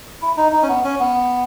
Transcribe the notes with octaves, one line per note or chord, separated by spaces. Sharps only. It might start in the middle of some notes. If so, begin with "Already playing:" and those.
E4
D#4
D#4
C#4
B3
C#4
B3